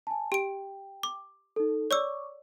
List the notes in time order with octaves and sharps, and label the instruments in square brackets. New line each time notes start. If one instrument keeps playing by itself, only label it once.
[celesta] G#5 A5
[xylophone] G4 D7 [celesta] G5
[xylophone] D6
[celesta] D#4 A4
[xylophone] C#5 D5 E6 [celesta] C#6 D6